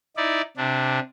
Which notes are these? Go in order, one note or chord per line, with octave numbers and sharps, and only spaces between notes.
D#4 E4 D5
C3 D4